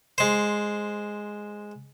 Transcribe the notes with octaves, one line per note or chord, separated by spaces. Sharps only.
G#3 C5